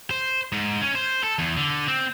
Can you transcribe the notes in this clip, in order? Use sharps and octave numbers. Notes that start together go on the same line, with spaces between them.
C5
G#2
C#4
C5
A4
E2
D3
C4